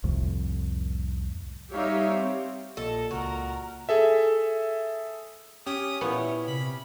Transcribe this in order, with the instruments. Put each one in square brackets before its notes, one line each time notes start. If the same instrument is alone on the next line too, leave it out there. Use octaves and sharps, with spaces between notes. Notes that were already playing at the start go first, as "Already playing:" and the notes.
[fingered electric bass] C2 F2 A2
[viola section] G3 D#4 G4 C#5 E5 F5
C4
[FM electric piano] A#1 [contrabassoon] A#2 [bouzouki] A4 [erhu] D#5
[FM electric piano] C#2 A5 [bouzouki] F#4 [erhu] A#4
[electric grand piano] G#4 A4 E5
[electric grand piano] C#4 G4 [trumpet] D#6
[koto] A#2 B3 [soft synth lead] E4 [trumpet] C#5
[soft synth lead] C3 [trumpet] B5